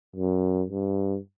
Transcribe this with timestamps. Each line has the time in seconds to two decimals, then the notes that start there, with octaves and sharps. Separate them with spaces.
0.16 F#2
0.69 G2